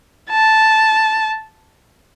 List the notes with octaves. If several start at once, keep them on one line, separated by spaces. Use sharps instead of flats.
A5